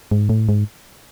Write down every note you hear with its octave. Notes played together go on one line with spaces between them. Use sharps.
G#2
A2
G#2